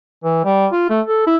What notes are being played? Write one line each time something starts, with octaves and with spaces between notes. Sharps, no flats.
E3
G3
F4
A3
A4
E4